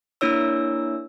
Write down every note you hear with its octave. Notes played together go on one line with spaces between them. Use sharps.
A#3 D4 E4 C#5 E6